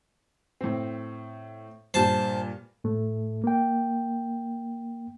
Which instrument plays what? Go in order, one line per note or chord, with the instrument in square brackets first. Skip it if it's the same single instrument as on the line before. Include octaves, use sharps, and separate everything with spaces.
[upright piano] A2 C4
[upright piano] G2 A#2 [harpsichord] C5 A5
[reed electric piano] A2 A3
A#3 G5